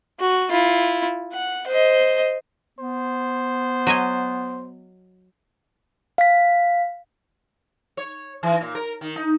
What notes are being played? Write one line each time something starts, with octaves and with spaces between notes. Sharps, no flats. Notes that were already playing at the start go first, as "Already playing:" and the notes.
F#4
E4 F4
F#5
C5 D#5
B3 C5
F#3 D#5 G#5
F5 B6
C#5
E3
A#2
A#4
D#3
D#4